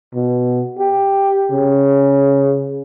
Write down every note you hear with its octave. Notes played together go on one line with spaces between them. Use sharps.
B2
G4
C#3